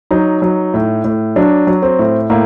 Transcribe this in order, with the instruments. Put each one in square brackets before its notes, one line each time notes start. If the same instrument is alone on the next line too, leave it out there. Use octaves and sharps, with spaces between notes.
[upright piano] F#3 D#4
F#3
A2
A2
F#3 D4
F#3
C4
A2
A2 A#3